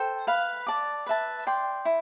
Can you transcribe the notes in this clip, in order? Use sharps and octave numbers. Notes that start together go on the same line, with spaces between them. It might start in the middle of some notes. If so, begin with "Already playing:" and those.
Already playing: A4 C5 G5
B4 F5 B5
D5 A5 D6
B4 E5 A5
D5 G5 C6
E4